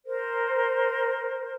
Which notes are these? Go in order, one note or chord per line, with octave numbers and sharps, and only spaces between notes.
A#4 C5